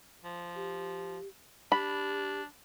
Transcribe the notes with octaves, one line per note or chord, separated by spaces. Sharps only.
F3
G4
D4 G4 B5